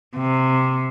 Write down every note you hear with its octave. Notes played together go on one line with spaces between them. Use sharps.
C3